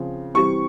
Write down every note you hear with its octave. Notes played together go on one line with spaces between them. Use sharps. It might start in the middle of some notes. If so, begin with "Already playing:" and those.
Already playing: C#3 F3 C4
C3 E3 G3 C4 C#6